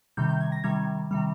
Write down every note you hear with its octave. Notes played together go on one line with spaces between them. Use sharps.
C3 D#3 G3 G6
G6
G#6
A#6
C3 D#3 G3 G#6
C3 D#3 G3